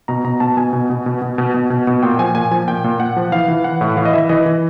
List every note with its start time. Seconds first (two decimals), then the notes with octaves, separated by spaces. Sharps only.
0.08 B2 A#5
0.24 B2 A#5
0.40 B2 A5
0.57 B2 G#5
0.73 B2
0.90 B2
1.06 B2
1.22 B2
1.38 B2
1.54 B2
1.70 B2
1.87 B2
2.03 A#2 G5
2.19 F3 G#5
2.35 A#2 G#5
2.51 F3 G#5
2.68 A#2 G5
2.84 A#2
3.00 A#2 F#5
3.16 F3
3.32 E3 F5
3.48 E3
3.64 E3 F#5
3.81 A2
3.97 E3 F5
4.05 D#5
4.13 E3 E5
4.29 E3 D#5
4.46 E3